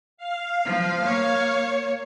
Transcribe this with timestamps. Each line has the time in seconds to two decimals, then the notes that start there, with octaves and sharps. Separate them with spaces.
0.17 F5
0.65 F3
1.03 A#3 C#5